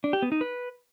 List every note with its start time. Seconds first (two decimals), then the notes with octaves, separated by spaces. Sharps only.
0.04 D4
0.13 G4
0.22 B3
0.32 D#4
0.41 B4